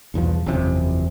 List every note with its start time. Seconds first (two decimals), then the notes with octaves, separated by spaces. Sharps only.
0.14 B1 E2 G2 F3
0.46 F#1 E2 C3 F3